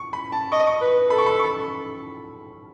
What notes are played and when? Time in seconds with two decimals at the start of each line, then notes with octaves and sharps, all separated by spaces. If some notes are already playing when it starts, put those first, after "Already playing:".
Already playing: C#6
0.13 B5
0.32 A5
0.52 D#5 C#6
0.67 C#6
0.81 B4
1.10 A4 B5
1.18 C#6
1.26 B5
1.40 C#6